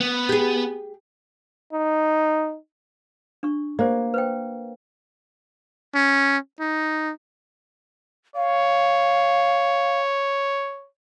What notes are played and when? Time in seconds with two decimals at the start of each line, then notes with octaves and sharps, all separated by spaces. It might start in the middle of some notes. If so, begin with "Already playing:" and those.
0.01 B3
0.29 G4 G#4
1.73 D#4
3.43 D4 C#6
3.79 A#3 G4 C5 D5
4.14 B4 C5 G5
5.95 C#4
6.60 D#4
8.36 C#5 F5